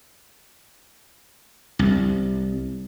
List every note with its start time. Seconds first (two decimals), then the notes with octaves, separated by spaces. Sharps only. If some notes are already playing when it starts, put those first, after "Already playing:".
1.79 C2